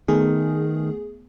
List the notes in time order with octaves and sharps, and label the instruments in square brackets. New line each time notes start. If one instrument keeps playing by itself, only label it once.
[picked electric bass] D#3 [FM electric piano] A3 B3 G#4